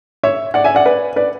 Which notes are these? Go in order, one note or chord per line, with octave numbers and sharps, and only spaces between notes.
C#5 E5
D5 F#5
E5 G#5
D5 F#5
B4 D5
B4 D5